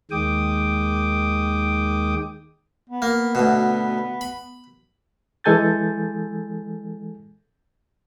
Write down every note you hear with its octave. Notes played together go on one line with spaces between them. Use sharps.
D#2 D#3 G#3 G5 D6 D#6
B3
A#3
D2 B2
B5
E3 G#3 A4 G#5 G6 A6